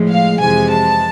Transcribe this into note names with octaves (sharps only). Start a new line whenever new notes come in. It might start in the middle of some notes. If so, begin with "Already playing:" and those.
Already playing: A2 F3 G#3
F5
F2 C3 E3 G#3 G#5
A5